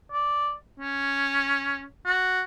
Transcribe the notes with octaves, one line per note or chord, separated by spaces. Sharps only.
D5
C#4
F#4